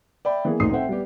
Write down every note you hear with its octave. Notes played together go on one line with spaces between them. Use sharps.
D5 E5 G5 B5
E3 A#3 B3 G#4
D1 A1 A#2 D#4 D#6 C7
A3 C4 C5 E5 F#5 G5
G3 B3 G4